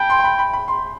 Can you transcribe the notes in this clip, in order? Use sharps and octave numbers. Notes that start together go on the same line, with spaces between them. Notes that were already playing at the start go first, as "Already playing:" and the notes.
Already playing: G5 A5 B5
C6
C6
B5
B5
B5
C6